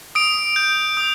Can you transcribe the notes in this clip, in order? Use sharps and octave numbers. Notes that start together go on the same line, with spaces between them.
D#6 D7
G6
D#6